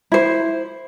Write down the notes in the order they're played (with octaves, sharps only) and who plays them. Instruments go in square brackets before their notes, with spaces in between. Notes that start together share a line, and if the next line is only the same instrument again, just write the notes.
[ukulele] E4 C5